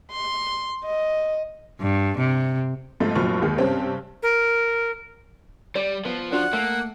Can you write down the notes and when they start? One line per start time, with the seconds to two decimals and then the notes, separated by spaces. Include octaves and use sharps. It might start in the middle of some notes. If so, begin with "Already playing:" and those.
0.12 C6
0.84 D#5
1.81 G2
2.18 C3
3.00 F2 G#2 F3 A3
3.15 F1 F#2 A#2 F3 C#6 F6
3.42 D#2 D#3 G#3
3.58 G2 C3 C4 C#4
4.23 A#4
5.75 G3 D5
6.05 F3 B3
6.32 D4 F4 F#4 F#5
6.53 A3 A#3